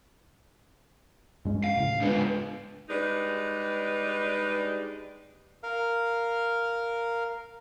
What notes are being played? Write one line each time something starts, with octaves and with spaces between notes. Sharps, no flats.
G2 G#3 C#4
F5
A2 C#3
G#2 G#3 B3 D4
G3 G#3 D4 D#4 B4
A#4 F5